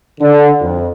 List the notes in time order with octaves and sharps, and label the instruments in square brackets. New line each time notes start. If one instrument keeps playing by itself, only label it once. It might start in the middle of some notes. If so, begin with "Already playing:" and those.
[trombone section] D3
F2